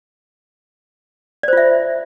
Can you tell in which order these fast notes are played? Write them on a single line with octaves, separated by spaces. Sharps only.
D5 C5 F4 E5